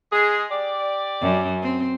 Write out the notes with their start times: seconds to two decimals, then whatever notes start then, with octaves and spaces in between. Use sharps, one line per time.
0.11 G#3 G#4
0.50 G4 D5
1.21 F#2
1.62 C4